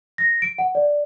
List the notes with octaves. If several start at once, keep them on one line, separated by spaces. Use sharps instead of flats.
A#6
D7
F#5
D5